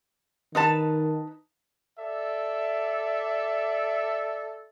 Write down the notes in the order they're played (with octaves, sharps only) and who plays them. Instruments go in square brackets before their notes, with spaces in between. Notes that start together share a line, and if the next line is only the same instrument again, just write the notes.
[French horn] D#3 [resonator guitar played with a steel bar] D#4 B4 A5
[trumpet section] A4 D5 E5